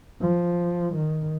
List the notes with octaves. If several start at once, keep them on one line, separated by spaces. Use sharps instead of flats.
F3
D#3